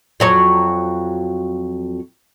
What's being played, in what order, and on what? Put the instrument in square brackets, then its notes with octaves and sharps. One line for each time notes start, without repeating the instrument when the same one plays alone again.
[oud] F2 F#3 C#5